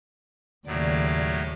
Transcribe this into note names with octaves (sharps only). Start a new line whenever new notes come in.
D#2 A2 C#3 F#3 D5